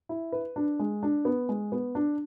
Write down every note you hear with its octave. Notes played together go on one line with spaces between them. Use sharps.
E4
B4
D4
G#3
D4
B3
G#3
B3
D4